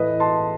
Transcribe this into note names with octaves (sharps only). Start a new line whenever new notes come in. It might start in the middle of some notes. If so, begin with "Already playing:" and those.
Already playing: A2 E3 B4 D#5
A5 C6